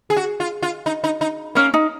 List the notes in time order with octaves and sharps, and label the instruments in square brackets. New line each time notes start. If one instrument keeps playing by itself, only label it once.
[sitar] G#4
F#4
F4
F4
D#4
D#4
D#4
[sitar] A#3 [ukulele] C#4
[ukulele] D#4